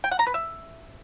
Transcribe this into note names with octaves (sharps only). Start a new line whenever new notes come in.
G5
F#5
A#5
B4
E5